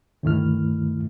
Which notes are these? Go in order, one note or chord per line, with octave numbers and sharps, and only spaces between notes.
D2 G2 D#3 A3 E4 F6